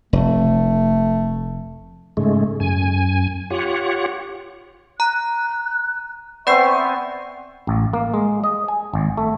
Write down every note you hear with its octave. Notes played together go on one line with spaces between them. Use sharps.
F1 A3
G#2 C#3 G#3 A3
F#2 G#5
F4 G4 C#5 F#5
A#5 F#6
B3 C4 D5 E5 C#6 G6 C7
A1
A#3
G#3
D#5
G#5
G#1
A3